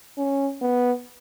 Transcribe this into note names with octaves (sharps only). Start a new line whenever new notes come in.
C#4
B3